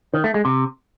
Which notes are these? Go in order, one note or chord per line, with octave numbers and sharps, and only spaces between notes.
D#3
A3
G#3
C3